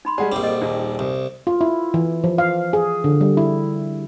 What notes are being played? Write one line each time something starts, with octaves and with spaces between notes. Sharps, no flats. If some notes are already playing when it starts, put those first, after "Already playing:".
D#4 B5 C6
G3 G#3 G#4 D5 F#5
A#1 G3 C4
A4 D#5
D#1 D#3
C2
F4
E4
E3
F3
F5
G#4
D3
G3
E4